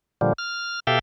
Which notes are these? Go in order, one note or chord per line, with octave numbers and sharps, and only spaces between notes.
A#2 D3 F3 G3
F6
B2 G4 A4 E5 F5 G5